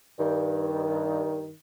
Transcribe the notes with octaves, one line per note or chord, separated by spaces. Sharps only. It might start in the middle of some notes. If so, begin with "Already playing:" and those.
G2 D#3